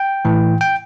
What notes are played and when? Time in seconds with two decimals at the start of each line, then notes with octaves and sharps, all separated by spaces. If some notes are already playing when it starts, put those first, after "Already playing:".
Already playing: G5
0.25 A2 E3
0.61 G5